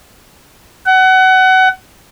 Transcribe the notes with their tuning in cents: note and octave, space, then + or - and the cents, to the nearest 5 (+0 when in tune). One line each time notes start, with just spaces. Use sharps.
F#5 +25